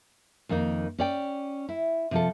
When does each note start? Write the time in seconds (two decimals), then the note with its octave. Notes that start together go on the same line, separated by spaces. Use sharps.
0.49 F2 D#3 A#3 D#4
0.98 C#4 D5 G5
1.69 E4
2.11 C3 F3 A4